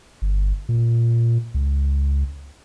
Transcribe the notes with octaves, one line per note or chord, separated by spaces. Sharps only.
G1
A#2
C#2